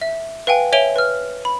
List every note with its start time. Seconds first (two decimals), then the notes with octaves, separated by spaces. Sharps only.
0.01 E5
0.47 B4 F5 G5 G#5
0.73 C#5 E5 G#5 D7 F7 G7
0.96 B4 F6
1.45 B5